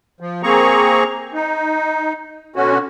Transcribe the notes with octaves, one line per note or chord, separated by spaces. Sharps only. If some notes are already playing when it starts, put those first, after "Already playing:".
F3
A#3 C4 G#4 A#5 C#6
D#4
B2 D3 C#4 F#4